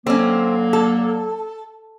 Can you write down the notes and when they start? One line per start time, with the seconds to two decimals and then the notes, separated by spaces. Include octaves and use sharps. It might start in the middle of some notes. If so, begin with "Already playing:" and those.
0.07 D3 F#3 A#3 C4 C#4
0.73 A4